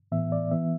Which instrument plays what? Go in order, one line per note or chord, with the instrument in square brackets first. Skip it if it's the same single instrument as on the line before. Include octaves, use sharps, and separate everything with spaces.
[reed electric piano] A2 E3 B3 E5
D5
E3 B3 E5